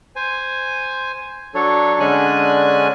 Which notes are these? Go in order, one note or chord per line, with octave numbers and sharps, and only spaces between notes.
C5 G#5
F#3 D4 A4 C#5
D3 G#3 C#4 D4 G#5 F#6